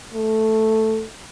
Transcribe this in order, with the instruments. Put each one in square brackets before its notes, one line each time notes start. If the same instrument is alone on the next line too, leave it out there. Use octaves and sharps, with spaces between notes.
[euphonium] A3